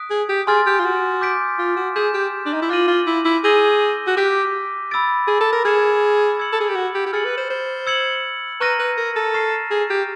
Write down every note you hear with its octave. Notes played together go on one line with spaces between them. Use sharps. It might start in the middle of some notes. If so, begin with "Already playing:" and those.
Already playing: D#6 F#6 B6 D7
G#4
G4
G#4 G#5 C6 F6 A6
G4
F4
F#4
D6 G6 B6 D7
F4
F#4
G#4 G6 B6 E7
G4
D4
D#4
E4
F4 D6 F#6 A#6 D#7 F#7
F4
E4
E4
G#4 E6 G6 A#6 D#7 G7
F#4
G4 D6 F#6 B6
B5 E6 A6 D7
G#4
A4
A#4
G#4 F6 G#6 C#7 E7
E6 G#6 C#7 F#7
A4
G#4
G4
F#4
G4
G4
G#4 F6 A6 C#7 F#7
B4
C5
C5
E6 G#6 C#7 F#7
B4 A#5 C#6 F6 A#6 D#7
B4
A#4
A4
C#6 F6 A6 C7 E7
G#4
G4